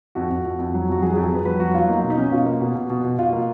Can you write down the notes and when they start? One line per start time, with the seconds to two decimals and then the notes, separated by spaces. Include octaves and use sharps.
0.15 F2 F#4
0.30 F2
0.44 F2
0.59 F2
0.74 F#3
0.88 F2 F#4
1.02 F#3 G#4
1.14 G#4
1.17 F2
1.24 G#4
1.31 F2 B4
1.45 F#3 B4
1.60 F#3 F#4
1.74 F#3 F4
1.88 A#3 D#4
2.03 B2
2.10 D#4
2.18 C#4
2.32 B2 F4
2.46 A#3
2.61 B2
2.75 B2
2.90 B2
3.04 B2
3.19 B2 F4
3.33 A#3